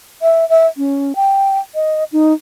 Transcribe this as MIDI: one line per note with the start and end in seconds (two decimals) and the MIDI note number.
0.22 0.48 76
0.49 0.67 76
0.77 1.15 61
1.16 1.59 79
1.75 2.04 75
2.13 2.33 63